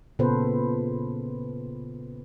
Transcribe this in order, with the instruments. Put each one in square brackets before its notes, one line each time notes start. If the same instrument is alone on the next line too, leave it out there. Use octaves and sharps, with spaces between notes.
[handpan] A#2 C#3 B3 A4 B4 C5